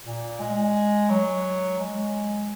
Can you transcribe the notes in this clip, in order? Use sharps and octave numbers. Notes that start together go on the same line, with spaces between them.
A#2
G#3
F#3
G#3